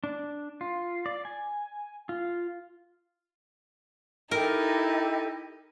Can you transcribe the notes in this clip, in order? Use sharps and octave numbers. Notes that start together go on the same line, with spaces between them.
D4
F4
D5
G#5
F4
D#4 E4 G4 A4 A#4 D#5